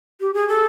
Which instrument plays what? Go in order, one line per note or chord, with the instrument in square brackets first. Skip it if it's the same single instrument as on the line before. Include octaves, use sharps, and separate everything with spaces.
[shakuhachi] G4
G#4
A4